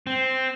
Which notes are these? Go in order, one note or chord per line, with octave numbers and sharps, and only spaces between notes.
C4